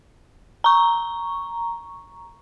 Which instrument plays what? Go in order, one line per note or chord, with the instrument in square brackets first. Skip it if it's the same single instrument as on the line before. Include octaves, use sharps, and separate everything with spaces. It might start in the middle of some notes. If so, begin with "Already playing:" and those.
[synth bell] A#5 C#6